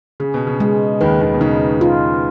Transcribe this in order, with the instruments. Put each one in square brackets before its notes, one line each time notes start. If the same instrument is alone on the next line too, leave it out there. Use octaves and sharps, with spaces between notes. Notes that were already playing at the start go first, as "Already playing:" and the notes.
[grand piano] C#3 [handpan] G#4
[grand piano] B2
C#3
[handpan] G#3
[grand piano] D#2 D#3 [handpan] B4
[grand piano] D#2 D#3
B2
[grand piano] C#3 [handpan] D#4
[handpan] F4